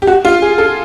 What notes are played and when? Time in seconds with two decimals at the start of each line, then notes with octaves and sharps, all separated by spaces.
0.02 G4
0.07 F#4
0.25 F4
0.42 G#4
0.58 A4